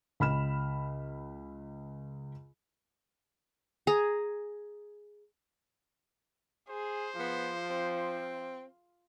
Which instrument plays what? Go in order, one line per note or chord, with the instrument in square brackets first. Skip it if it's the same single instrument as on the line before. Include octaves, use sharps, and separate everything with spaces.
[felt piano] C#2 B5 F6 E7
[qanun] G#4 A#5
[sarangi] G#4 [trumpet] C5
[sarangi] F3 [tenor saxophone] B3
[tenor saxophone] C4